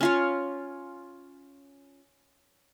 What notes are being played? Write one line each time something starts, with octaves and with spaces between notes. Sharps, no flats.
C#4 F4 C#5